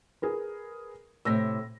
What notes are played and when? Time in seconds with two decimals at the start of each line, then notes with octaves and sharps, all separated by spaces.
0.22 G#4 A#4 B4
1.25 A2 C3 E6 A#6